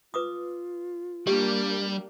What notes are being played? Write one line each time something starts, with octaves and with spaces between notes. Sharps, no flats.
F4 B4 D6 D#6
G3 A#3 D4 G4 D5